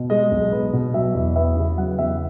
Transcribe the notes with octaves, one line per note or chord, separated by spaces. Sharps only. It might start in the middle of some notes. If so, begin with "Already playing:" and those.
Already playing: B2
G#3 D#5
B1
B3
B2
F#3 E5
E2
B3 E5
C#3
F#3 F#5
E2 E5